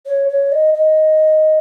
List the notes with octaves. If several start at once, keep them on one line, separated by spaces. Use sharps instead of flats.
C#5
C#5
D#5
D#5